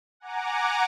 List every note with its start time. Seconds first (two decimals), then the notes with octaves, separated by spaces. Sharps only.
0.20 F#5 G#5 A#5 D6